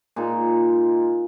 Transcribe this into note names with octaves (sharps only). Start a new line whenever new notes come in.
A#2 G#3 D#4